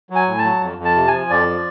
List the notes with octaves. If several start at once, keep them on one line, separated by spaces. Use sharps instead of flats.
F#3
G#5
A2
A5
F#3
F2
F2
A5
C3
G#5
F3
F2 D5
F3